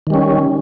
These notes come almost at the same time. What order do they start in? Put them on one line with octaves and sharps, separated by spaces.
D#3 G3 C#4